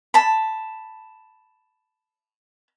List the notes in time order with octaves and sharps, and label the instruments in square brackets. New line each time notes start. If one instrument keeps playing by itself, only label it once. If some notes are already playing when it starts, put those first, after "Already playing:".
[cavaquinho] A5 B5